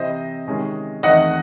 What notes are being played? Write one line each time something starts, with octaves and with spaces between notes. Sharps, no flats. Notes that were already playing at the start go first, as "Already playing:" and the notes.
Already playing: C3 E3 C4 C5 D#5
C3 D#3 G#3 C#4
E2 D#3 A3 C4 D#5 F#5